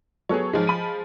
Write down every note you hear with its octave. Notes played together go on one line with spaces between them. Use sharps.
F#3 B3 G#4 A4 C#5
G#2 F3 G#3
B5 D#7